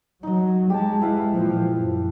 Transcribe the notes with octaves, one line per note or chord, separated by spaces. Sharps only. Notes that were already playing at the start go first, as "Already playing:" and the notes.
F#3 D#4 D#5
G#3 G4 A5
E4 B4 F5
A#2 F3
F#2